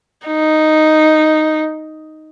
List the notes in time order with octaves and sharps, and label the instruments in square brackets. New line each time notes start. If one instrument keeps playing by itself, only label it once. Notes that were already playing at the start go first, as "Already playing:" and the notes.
[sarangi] D#4